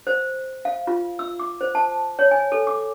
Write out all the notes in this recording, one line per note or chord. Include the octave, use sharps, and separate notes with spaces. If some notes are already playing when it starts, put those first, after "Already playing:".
C5
F5
F4
E6
D6
C5
A5
C#5
G#5
A4
D6